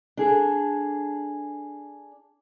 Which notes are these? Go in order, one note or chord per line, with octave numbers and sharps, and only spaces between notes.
D4 G#4 A4